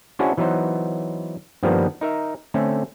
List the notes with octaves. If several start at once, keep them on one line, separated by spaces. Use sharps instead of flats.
C#4 D4 E4 F#4 G#4 C5
E3 F#3 B3 D#4 C5
G2 D#3 F3 G3 A#3 B3
D#4 A#4 E5
D3 A3 C4 C#4